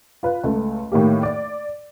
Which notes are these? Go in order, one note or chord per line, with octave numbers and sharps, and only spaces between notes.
F4 B4
C#2 A3
A2 D#3 A#3 G4
D5